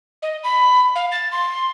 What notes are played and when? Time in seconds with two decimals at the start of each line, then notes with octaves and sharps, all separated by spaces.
0.22 D#5
0.44 B5
0.95 F5
1.12 A6
1.32 C6